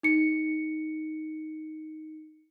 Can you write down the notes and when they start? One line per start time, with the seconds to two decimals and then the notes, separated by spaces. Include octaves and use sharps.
0.03 D#4 C#7